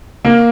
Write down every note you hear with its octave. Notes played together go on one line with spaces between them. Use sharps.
A#3